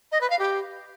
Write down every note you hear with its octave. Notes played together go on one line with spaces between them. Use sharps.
D#5
B4
F5
G4